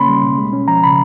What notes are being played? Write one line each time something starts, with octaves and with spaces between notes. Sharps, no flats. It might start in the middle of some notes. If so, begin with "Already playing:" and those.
Already playing: C#3 A#3 C#4 B5 C6
G3
B2
G#3
C#4
F3 A#5
C#3 B5